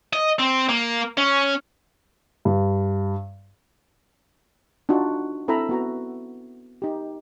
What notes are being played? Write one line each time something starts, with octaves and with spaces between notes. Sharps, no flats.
D#5
C4
A#3
C#4
G2
D4 D#4 F4 F#4
C4 E4 A4 E5 A#5 B5
B3 F#4 A#5
D#4 G4